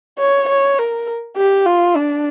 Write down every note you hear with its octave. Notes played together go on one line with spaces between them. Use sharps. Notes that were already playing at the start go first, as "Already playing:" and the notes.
C#5
C#5
A#4
G4
F4
D4